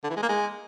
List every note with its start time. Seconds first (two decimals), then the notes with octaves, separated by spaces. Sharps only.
0.04 D3
0.10 E3
0.16 G#3
0.23 A#3
0.29 G#3